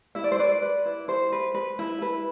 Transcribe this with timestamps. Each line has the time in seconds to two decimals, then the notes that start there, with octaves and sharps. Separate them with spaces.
0.15 E4 E5
0.24 D5
0.32 C5
0.39 B4 D5
0.62 B4
0.85 E4
1.08 E4 C5
1.32 B4
1.55 B4
1.79 E4
2.02 E4 B4